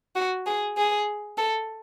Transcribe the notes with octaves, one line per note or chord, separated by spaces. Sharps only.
F#4
G#4
G#4
A4